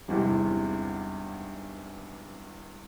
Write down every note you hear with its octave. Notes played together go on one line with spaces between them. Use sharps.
G#1 E2 G2 C3